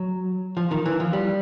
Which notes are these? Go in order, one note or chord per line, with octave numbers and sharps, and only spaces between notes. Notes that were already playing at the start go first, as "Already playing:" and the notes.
Already playing: F#3
F3
D#3
E3
F3
G3